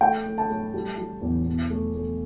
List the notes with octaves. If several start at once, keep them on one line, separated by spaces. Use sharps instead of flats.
A3 G5
A3
A5
A3
G3
G3
E2
B2
A3
A3